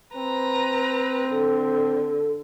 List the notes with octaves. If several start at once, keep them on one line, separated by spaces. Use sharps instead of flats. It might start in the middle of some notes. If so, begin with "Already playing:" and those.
C4 B4 A#5
D3 A4